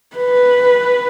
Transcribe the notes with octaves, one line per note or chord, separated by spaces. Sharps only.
B4